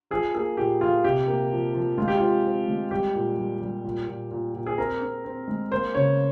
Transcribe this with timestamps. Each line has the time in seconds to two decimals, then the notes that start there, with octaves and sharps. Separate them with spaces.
0.11 F3 G#4
0.34 A#3 G#4
0.57 A#2 G4
0.80 F3 F4
1.04 C3 G4
1.28 A#3
1.52 F3
1.74 F3
1.98 G#3 F4
2.08 G4
2.18 C4 F4
2.45 C4
2.68 G#3
2.91 G3 G4
3.15 A#2
3.38 G3
3.61 G3
3.85 A#2
4.08 A#2
4.31 A#2
4.54 A#2
4.66 G#4
4.78 C4 A#4
5.01 C4
5.25 C4
5.48 G#3
5.71 A#3 C5
5.95 C#3 C#5